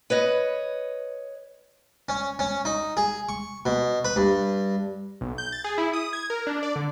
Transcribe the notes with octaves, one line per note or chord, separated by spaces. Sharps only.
B4 C#5 D#5
C#4
C#4
D#4
G#4
C#6
B2
B4
G2
B1
G6
A6
G#4
E4
D#6
G#6
A#4
D4
D5
D3